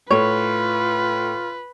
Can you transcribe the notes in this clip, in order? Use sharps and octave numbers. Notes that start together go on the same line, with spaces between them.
A2 F4 B4 C#5